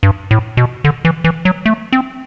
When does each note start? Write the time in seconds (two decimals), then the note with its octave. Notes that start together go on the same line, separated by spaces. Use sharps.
0.03 G2
0.31 A2
0.57 B2
0.84 D3
1.05 E3
1.24 E3
1.45 F#3
1.66 A3
1.93 C4